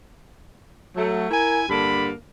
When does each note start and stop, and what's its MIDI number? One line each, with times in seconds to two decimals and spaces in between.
0.96 1.27 54
0.96 1.27 57
1.31 1.64 64
1.31 1.64 70
1.31 1.64 80
1.69 2.11 43
1.69 2.11 50
1.69 2.11 58
1.69 2.11 69
1.69 2.11 83